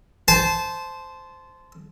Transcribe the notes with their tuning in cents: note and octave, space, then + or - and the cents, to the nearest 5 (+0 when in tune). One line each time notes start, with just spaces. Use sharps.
C5 -10 A5 -20